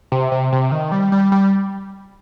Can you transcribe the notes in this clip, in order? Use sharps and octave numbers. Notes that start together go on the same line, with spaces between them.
C3
C3
C3
D#3
G3
G3
G3